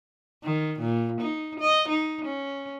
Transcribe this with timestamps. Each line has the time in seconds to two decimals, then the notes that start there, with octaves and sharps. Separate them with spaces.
0.44 D#3
0.79 A#2
1.21 D#4
1.60 D#5
1.89 D#4
2.26 C#4